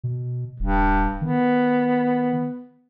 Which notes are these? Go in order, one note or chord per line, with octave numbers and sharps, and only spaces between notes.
B2
D#1 G2
D#3 B3